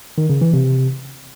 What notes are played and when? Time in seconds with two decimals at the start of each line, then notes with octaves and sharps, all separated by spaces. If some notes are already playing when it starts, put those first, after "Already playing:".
0.18 D#3
0.30 C#3
0.41 E3
0.53 C3